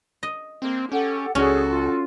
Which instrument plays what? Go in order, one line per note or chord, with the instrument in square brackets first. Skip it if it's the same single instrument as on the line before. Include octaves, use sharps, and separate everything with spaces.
[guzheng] D#5
[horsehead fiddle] A#3 [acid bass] C4
[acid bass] C#4 [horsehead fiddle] G4 [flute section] A4 F#5
[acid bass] C#2 [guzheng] C#4 [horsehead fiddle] F#4 A4 [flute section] G#4 D5
[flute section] F4